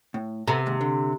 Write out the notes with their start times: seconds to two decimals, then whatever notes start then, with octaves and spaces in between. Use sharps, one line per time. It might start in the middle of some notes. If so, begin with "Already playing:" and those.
0.14 A2
0.48 C3 B3 A4 A#5
0.66 D#2 G#2
0.81 D3